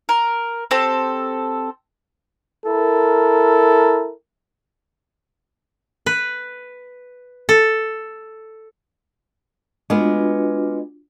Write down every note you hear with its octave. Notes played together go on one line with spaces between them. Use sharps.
A#4
C4 G4 A4
E4 A4 A#4
B4
A4
G#3 B3 D4 F4 F#4